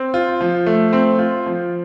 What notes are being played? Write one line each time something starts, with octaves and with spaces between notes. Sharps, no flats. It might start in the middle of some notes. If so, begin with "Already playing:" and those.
Already playing: C4
F4
F3
A3
C4
F4
F3